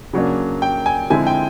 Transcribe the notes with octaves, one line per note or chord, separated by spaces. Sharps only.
C#3 F#3 A#3 D4
G5
G#5
D3 F3 G#3 C4 E4 G#5
G5